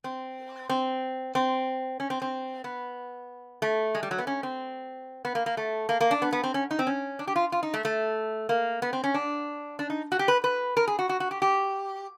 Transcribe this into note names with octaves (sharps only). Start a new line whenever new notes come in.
C4
C4
C4
C#4
C4
C4
B3
A3
G#3
G3
F#3
B3
C#4
C4
B3
A#3
A#3
A3
A#3
A#3
D4
B3
B3
C4
C#4
D#4
C4
C#4
D4
G4
F4
F4
D#4
A3
A3
A#3
B3
C4
C#4
D4
D4
D#4
F#4
G4
B4
B4
A#4
G#4
F#4
F#4
F#4
G4
G4